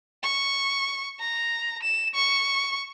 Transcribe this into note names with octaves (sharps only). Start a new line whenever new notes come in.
C#6
A#5
E7
C#6